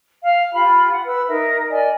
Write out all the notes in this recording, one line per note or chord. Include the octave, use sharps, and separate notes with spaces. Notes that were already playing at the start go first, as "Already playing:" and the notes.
F5
F4 G4 B5
F#5
B4 E6
D#4 A#4 E5
A#4 D5 D#5 G#5